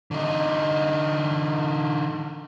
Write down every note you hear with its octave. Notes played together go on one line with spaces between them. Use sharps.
D3 D#4